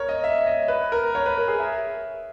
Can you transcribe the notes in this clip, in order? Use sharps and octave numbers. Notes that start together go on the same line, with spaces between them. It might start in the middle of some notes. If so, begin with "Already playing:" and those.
Already playing: A#4 C#5
D#5
E5
D#5
B4
A#4
C#5
B4
A#4
G#4
E5